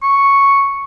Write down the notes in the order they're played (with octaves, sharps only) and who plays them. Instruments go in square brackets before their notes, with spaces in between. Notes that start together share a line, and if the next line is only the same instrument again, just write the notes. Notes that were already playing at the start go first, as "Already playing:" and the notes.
[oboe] C#6